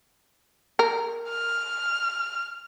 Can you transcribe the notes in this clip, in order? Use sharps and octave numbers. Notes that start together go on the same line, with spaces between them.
A#4
F6